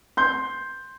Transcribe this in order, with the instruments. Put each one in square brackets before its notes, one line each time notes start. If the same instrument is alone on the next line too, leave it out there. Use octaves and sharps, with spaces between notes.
[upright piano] C6 G6